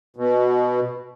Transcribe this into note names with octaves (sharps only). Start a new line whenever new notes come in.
B2